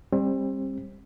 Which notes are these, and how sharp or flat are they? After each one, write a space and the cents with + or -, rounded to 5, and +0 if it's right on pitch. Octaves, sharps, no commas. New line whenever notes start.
G3 +20 C4 +30